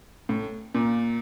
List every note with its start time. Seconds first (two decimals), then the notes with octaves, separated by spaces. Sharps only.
0.29 A2
0.75 A#2